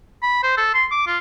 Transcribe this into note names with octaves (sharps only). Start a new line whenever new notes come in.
B5
C5
A4
C6
D6
F4